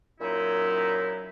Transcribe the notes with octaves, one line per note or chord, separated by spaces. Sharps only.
F#2 A#2 F#3 D#4 E4